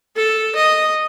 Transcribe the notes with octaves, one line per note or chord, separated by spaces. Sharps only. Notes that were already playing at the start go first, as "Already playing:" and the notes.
A4
D#5